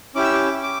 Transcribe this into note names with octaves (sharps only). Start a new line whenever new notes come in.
C#4 E4 G4 D6
E6
D6
D6